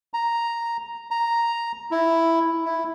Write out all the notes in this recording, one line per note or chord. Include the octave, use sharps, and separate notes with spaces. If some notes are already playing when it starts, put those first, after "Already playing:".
A#5
A#5
E4
E4